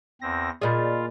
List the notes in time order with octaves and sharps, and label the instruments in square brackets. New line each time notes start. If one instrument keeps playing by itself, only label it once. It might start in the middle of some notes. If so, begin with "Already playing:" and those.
[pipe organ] E2 C4 A#6
[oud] A#2 G#4 [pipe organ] F4 [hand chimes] D5 D#5 B5